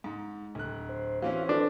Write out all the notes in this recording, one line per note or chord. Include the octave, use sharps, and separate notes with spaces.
G#2
D1 F#6
C5
E3 C4 C#4 F#4 F5
D4 A4 B4